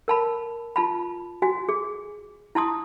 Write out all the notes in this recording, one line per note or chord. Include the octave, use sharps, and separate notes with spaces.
A#4 A5 B5
F4 A5 B5
F#4 G#5
G#4
E4 A5 C6 D#6